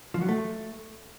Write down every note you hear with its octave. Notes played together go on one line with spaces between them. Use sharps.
F3
F#3
A3